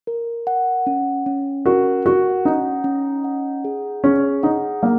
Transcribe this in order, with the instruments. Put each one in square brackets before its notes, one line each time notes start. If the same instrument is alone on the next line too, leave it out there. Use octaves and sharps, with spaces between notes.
[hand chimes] A#4
F#5
C#4
C#4
[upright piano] F#4 [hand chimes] A#4
[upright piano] F#4 [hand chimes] F#5
[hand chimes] C#4 [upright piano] D#4
[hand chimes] C#4
F#5
G#4
[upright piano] C#4 [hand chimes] G#4
[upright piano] D#4 [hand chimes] F#5
[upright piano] A#3 [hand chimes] F#5